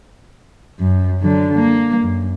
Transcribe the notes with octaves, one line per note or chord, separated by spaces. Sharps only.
F#2
D3 F#3
A#3
F#2